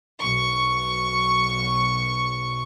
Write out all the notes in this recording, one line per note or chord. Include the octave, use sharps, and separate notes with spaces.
B1 C#6